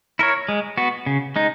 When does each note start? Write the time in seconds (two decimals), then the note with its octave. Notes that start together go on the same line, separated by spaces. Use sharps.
0.19 E4 A#4 C#5
0.49 G#3
0.78 B3 F#4
1.06 C#3
1.36 G#3 D#4